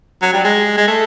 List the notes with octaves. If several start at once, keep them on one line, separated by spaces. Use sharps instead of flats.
F#3
G3
G#3
G#3
A3